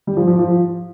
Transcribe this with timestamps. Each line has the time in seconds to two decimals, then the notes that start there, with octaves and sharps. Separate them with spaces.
0.07 G3
0.17 F3
0.27 F3
0.39 F3